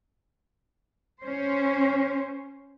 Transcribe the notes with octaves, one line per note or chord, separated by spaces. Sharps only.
C#4 C5